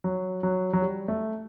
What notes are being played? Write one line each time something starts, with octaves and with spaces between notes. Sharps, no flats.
F#3
F#3
F#3
G3
A3